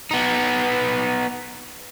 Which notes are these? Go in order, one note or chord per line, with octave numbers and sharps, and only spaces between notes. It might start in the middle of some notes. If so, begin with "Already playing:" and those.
B3 D#4